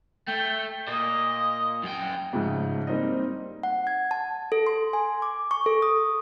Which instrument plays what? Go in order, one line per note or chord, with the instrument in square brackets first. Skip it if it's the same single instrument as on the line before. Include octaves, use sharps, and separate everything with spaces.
[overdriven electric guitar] A3 [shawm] G5
[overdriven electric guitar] A#2 [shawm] D#5
[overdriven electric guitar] F#2 G5
[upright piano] G#2 C#3 F3 A3
G3 A#3 C4 D#4 D#5
[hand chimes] F#5
G#6
A5
A4
C6
G#5
D6
C#6
A4
D#6